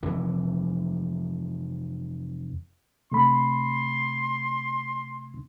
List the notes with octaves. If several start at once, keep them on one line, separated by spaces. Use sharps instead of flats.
F1 F2 E3
C3 A3 B5 C6